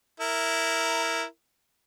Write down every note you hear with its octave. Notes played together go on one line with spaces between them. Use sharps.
E4 A#4